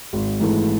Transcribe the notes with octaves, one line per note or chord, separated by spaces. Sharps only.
G#1
G#2 E3 A3